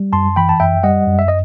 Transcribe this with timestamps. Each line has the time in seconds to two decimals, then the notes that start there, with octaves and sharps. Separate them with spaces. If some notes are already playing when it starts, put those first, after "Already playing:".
Already playing: G3
0.13 F#2 A5 C6
0.36 E3 G5 B5
0.49 A5
0.60 F#2 E5 G5
0.83 G3 D#5 F#5
1.07 F#2
1.19 E5
1.28 D#5